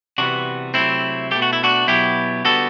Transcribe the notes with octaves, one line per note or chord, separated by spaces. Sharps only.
C3 E3 G3 B3 D4 F#4
C3 F#3 A3 C4 E4
B2 A3 G4
F#4
E4
D4 F#4
B2 F#3 B3 E4 G4
D3 G3 B3 F#4 A4